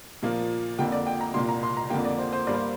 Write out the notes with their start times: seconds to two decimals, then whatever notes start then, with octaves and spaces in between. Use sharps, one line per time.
0.23 A#2 F3 A#3
0.78 F2 D3 A#3 G5
0.92 D5
1.06 G5
1.20 A#5
1.34 C2 A#2 A#3 C6
1.48 A#5
1.63 C6
1.77 A#5
1.90 F2 D3 A#3 G5
2.05 D5
2.19 C5
2.33 C5
2.47 G2 G3 A#3 D5
2.54 C5